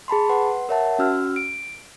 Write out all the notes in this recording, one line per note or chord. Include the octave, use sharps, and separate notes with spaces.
G#4 A5 B5 C6
B4 F#5 C6
A#4 C#5 E5 F#5 A5
C#4 F#4 E6 F6
D7